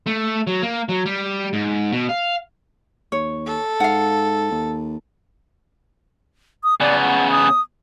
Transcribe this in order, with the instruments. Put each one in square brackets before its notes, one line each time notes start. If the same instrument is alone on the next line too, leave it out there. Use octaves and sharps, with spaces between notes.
[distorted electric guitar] A3
F#3
A#3
F#3
G3
G#2
B2
F5
[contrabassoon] D#2 [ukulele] C#5
[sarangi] A4
[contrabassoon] G#2 [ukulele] F5 F#5
[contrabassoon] D#2
[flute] D#6
[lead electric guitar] C#3 B3 [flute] D5
[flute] F#5
D#6